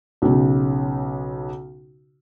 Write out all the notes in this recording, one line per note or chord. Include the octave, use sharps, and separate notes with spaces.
B1 C#3